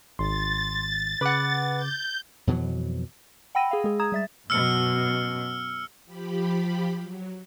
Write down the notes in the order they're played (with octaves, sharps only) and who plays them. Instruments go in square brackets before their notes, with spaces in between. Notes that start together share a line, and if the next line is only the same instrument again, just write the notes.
[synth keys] G#1 [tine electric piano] C6 [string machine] A6
[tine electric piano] C#3 D6 [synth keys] B4 F#5
[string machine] G6
[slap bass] F2 B2 E3 F#3
[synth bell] F#5 G5 B5 E6 A#6 D#7
G#4 F5
G#3 G#4
A#5 D#6 G#6 E7
G3 E5 A6
[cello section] F#2 B2 [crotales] E6 F6 C#7
[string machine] F3 G4 B5
F#3